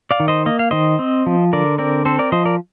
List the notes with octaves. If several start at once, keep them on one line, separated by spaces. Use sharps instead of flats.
D5 F5
D#3
C5 D#5
A#3 D#5
F5
D#3 C5 D#5
C4
F3
D3 A#4 D5
C4 A#4 D5
C4 A4 C5
A#4 D5
F3 C5 D#5
A#4 D5